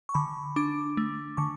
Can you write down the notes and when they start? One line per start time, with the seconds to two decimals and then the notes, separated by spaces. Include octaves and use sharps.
0.09 C#6
0.14 D3 B5
0.56 D4 D6
0.97 A3
1.37 D3 C#6